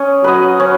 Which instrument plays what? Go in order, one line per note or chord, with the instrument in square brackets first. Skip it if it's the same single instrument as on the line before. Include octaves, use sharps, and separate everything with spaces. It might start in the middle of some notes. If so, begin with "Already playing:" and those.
Already playing: [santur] C#4 D#5
[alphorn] F#3 [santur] B4 D#5
[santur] C#4